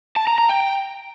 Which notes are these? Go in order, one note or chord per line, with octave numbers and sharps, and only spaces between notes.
A5
A#5
A#5
G5